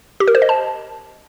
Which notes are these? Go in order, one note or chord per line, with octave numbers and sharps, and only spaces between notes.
G4
A#4
C5
D#5
A5